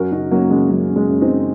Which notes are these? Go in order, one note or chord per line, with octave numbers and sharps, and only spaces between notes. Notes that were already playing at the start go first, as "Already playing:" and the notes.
Already playing: F#2 F#4 A#4
C#3 D#4 F#4
F#2 F#3 A#3
C#3 G#3
F#2 F#3
C#3
G#3
F#2
C4 D#4
C#3